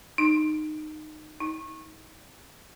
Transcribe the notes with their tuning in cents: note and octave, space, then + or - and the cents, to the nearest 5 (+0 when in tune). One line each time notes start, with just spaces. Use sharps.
D#4 -20
D#4 +30